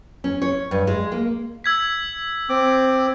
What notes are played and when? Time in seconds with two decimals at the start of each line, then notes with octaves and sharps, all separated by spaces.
0.24 C#4
0.42 C#5
0.71 G2
0.87 G#3
1.12 A#3
1.64 E6 G#6 B6
2.49 C4 D6